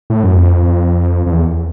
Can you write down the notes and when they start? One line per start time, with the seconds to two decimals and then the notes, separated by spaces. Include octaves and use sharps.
0.10 A2
0.23 F#2
0.35 F2
1.26 F2
1.32 E2